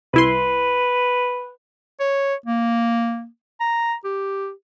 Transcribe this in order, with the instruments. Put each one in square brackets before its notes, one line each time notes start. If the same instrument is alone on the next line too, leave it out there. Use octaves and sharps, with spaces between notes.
[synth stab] C2 E4 C6 [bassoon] B4
[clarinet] C#5
A#3
A#5
G4